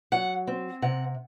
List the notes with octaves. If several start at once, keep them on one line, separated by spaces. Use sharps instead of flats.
F#3 F#5
C4
C3 F#5